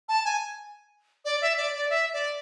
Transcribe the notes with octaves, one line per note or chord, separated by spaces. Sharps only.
A5
G#5
D5
E5
D5
D5
E5
D5